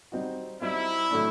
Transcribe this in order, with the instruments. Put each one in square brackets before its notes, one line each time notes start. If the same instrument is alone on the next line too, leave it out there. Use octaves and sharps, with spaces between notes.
[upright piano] G3 C4 D#4 F#4
[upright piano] G3 C4 D#4 F#4 [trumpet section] E4
[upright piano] A2 F#3 A3 D4